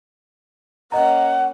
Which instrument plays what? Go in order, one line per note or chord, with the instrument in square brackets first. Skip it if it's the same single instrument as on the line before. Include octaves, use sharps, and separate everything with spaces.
[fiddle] A#3 C#4 [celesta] D#5 A#5 [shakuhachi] F#5